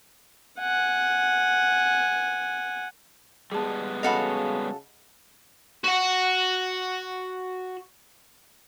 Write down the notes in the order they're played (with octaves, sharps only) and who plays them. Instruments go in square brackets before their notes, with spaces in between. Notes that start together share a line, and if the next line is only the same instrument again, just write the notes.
[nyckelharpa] F#5 G#5
[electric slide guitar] G3 G#3 B3 [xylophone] G#4 A5
[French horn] C#3 [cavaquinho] F#4 A4 F5 [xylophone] D#5 F#5 B5
[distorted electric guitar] F#4 F#5